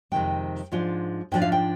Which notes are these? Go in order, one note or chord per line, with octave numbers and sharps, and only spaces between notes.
F2 C3 D#3 G#3 G5
G#2 F3 G#3 D4 F4
G#2 F3 G#3 D4 F4 G5
F5
G5